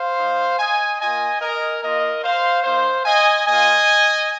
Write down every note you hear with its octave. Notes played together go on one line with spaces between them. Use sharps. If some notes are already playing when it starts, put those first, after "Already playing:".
Already playing: C5 F5
G#3 D#4
D#5 G#5
A#3 F4 D#5 G#5
A#4 D#5
A#3 F4 A#4 D#5
C5 F5
A#3 D#4 C5 F5
D#5 G#5
A#3 F4 D#5 G#5